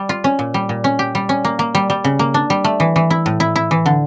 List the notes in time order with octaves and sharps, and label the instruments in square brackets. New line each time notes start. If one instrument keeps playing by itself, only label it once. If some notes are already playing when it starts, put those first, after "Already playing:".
Already playing: [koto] G3
F4
C#4
A#2
G3
A#2
C#4
G4
G3
C#4
A#3
A#3
G3
G3
C#3
A#3
D4
G3
A3
E3
E3
E4
A2
E4
E4
E3
D3